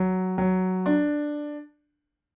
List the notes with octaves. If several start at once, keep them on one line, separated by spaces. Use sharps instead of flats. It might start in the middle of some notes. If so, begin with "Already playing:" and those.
Already playing: F#3
F#3
D4